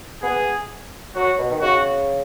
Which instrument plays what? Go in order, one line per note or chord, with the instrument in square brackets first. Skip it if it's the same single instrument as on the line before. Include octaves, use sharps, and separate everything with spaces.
[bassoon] B3 [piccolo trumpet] G#4
[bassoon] F#3 [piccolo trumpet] F#4
[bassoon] B2
D#3
[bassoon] C#3 [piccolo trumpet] F#4